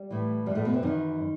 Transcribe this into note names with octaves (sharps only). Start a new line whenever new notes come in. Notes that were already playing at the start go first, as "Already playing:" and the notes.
Already playing: G3
A2 E3
F#2 A2 E3 G3 A3
B2 B3
C3 C4
F#2 D#3 E3 D#4